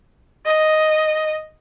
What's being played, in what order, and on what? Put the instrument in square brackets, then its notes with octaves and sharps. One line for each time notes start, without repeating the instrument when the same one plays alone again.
[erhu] D#5